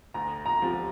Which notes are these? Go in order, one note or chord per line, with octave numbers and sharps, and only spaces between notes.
D2 A#5
A#5
C3 F3